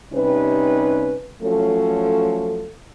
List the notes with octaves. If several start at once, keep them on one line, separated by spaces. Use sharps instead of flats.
C3 G3 C#4 D#4 B4
F3 F#3 A3 C#4 A4